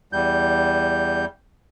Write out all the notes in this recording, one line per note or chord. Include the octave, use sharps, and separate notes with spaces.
E2 G3 G6